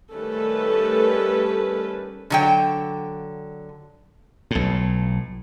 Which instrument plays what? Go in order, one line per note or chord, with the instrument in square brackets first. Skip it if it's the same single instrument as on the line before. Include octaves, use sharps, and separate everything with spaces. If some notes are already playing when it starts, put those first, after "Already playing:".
[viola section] D#3 G3 A3 C#4 A4 B4
[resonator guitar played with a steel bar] D3 F#3 G5
[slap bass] B1 A2